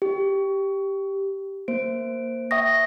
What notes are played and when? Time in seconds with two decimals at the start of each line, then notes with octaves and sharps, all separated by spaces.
0.02 G4
1.68 A#3 C5 D7
2.51 E5 G5 C#6 D#6 A#6